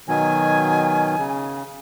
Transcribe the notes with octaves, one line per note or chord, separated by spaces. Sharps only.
B2 D#3 F#3 G#5
C#3